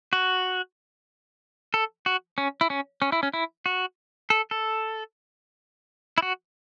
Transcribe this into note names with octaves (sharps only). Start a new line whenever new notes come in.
F#4
A4
F#4
C#4
E4
C#4
C#4
E4
C#4
E4
F#4
A4
A4
E4
F#4